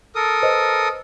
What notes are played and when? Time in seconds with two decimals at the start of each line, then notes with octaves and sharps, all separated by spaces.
0.15 A4 A#4 D#6
0.43 B4 C5 D#5